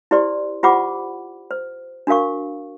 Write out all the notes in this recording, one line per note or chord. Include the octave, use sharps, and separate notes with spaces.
E4 G4 C5 D5 C6
F4 G4 C5 F#5 B5 D6
C5
D4 F#4 A#4 F5 C#6